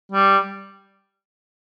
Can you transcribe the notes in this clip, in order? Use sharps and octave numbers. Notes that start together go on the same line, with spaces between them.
G3